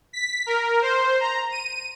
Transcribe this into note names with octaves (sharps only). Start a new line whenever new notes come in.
B6
A#4
C5
A#5
D#7